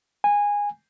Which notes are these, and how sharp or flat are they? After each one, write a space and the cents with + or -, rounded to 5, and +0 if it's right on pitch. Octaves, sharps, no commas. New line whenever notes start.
G#5 -15